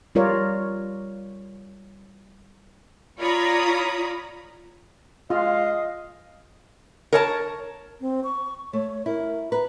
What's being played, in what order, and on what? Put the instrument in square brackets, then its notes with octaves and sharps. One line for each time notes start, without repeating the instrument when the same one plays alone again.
[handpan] G3 F4 A#4 C#5 D5
[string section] F4 C#5 D5 A#5 B5 D#6
[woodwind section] G#3 F5 [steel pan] F4 [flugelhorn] D#5
[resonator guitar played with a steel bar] A#4 C#5 A5
[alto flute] C4
C#6
[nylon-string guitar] A3 [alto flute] C#5
[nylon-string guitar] E4 [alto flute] A#4
[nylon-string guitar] B4 [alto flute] A#5